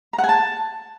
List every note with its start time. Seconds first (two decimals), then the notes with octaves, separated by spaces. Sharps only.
0.13 A#5
0.18 F#5
0.24 G#5
0.29 A5